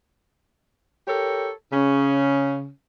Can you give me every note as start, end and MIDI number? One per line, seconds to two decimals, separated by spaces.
1.08 1.50 67
1.08 1.50 69
1.08 1.50 70
1.08 1.50 73
1.73 2.69 49
1.73 2.69 61